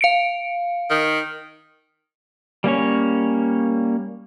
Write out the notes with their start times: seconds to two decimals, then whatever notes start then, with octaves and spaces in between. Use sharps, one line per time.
0.01 F5 C#7 D7
0.91 D#3
2.64 G3 A#3 C#4 C#5